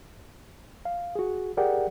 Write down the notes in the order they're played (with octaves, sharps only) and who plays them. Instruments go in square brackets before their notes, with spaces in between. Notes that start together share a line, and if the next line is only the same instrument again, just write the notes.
[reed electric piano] F5
F#4 G#4
G4 G#4 A#4 D5 F#5 G5